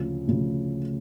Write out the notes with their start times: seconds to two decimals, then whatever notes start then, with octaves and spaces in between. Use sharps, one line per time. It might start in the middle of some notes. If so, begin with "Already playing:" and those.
Already playing: D2 C#3 F3
0.28 D2 C#3 F3